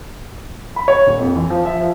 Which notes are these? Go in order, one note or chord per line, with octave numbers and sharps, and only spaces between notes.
B5
C#5
D#1
F2
E3
F3
E5
F3